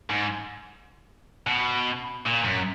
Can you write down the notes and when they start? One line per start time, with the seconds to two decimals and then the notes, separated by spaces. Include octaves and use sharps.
0.10 G#2
1.47 B2
2.26 A#2
2.44 F#2